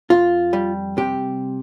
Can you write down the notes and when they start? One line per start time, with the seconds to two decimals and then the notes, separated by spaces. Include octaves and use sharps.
0.10 F2 F4
0.53 G3
0.97 C3 G4